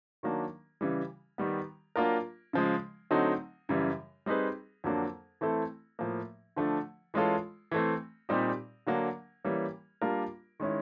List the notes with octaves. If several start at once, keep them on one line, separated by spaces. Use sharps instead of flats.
D#3 F#3 A#3 D4
C#3 E3 G3
D#3 G3 B3
F#3 A#3 D4 F4 A#4
C#3 F3 G#3
D3 F#3 A3 C4 D#4
F#2 C#3 E3 G3
G3 C4 D#4 G#4 B4
F2 D3 F#3 A#3 D4
E3 A3 C4 E4 A4
A2 F3 A#3
D3 F3 A3 D4
E3 G#3 C#4 F4 A4
E3 A3 C4
A#2 G3 C4 D#4 G4
D3 F#3 A#3 D4
E3 G3 A#3 C#4
G3 A#3 D4 F4 A#4
D#3 G#3 C#4 E4